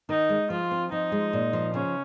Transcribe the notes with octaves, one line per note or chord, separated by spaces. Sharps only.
D#3 D#4
G#3
F3 F4
C4
F3 D#4
G#3
A#2
F3
C#3 C#4